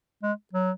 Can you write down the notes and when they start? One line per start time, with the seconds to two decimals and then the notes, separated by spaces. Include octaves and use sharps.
0.23 G#3
0.53 F#3